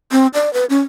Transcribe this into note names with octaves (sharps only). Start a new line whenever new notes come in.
C4
D5
B4
C#4